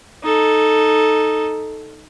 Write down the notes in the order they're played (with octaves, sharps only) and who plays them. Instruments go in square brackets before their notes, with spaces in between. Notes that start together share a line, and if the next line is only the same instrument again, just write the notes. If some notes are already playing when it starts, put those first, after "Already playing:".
[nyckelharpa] D#4 A4